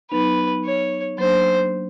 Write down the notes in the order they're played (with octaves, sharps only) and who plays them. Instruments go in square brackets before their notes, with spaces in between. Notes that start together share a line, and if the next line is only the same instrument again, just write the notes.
[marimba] F#3 B3 D#4 [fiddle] B4
[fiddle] C#5
[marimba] F#3 A#3 D4 [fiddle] C5